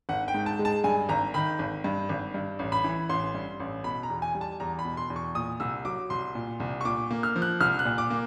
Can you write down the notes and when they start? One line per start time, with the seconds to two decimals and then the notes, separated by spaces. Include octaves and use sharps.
0.09 G#1 F#5
0.28 G5
0.34 G#2
0.46 A5
0.59 G#3
0.65 A5
0.84 G2 G#5
1.09 G#1 A#5
1.34 D#3 B5
1.59 G#1
1.84 G2
2.09 G#1
2.34 G2
2.59 A1
2.72 B5
2.84 E3
3.09 A1 C6
3.34 G2
3.60 A1
3.84 B2 B5
4.03 A#5
4.10 E2
4.22 G#5
4.35 G3
4.41 A5
4.60 E2 A#5
4.79 B5
4.85 B2
4.97 C6
5.10 E2
5.16 C#6
5.35 A#2 D#6
5.60 C2 E6
5.85 F#3 D6
6.10 C2 C6
6.35 A#2
6.60 C2
6.81 C#6
6.85 A#2 D6
7.11 A#3
7.23 F6
7.36 F3
7.42 F#6
7.60 C2 F6
7.79 F#6
7.85 A#2
7.98 D6
8.10 A#3